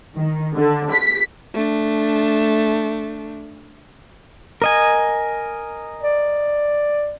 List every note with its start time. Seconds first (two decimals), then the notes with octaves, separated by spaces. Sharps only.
0.17 D#3
0.55 D3
0.91 B6
1.54 A3 D4
4.62 A#4 D#5 G#5
6.02 D5